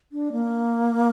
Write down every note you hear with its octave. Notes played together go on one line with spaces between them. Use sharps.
D4
A#3